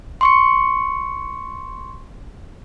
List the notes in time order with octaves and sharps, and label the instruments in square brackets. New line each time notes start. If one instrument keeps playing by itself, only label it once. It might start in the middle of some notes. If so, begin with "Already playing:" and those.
[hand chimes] C6 C#6 C#7